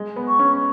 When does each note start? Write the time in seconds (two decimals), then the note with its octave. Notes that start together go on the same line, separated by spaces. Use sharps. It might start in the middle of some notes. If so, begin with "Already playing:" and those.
Already playing: G#3
0.16 B3
0.27 C#6
0.39 C#4